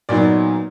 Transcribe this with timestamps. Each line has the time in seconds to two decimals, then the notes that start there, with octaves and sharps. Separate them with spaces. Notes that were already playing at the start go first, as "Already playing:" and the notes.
0.09 A#2 F#3 B3 D#4 D5